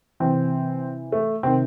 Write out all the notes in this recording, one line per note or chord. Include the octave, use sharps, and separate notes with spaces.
C3 E3 C4
A3
C3 D#3 C4